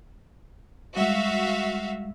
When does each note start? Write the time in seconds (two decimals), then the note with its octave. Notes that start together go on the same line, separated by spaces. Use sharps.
0.97 G3 G#3 F#4 E5 F5